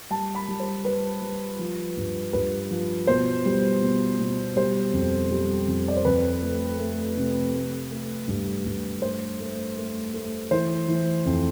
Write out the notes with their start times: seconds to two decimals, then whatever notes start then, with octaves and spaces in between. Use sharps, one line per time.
0.10 G3 A5
0.35 B5
0.48 G3
0.60 C5
0.84 G3 B4
1.22 G3
1.59 F3
1.97 G2
2.33 G2 B4
2.71 F3
3.07 B2 C5
3.45 G3
3.82 B2
4.19 B2
4.56 G3 C5
4.93 F2
5.31 G3
5.67 F2
5.88 D5
5.97 C5
6.05 F2 B4
6.42 A3
6.79 A3
7.17 C3
7.53 A3
7.91 A3
8.28 G2
8.65 G2
9.02 A3 C5
9.40 A3
9.77 A3
10.14 A3
10.51 E3 C5
10.88 E3
11.26 F2